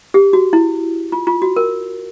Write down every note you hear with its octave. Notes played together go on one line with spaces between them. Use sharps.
G4
F#4
E4
F4
F4
F#4
A#4